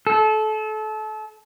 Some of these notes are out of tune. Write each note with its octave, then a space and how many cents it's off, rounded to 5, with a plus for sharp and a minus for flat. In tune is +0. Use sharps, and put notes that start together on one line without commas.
A4 -30